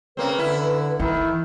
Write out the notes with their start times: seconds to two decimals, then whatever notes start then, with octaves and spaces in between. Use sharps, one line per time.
0.17 C#3 A#3 C4 B4
0.39 D3 E4
1.00 D#3 E3 E4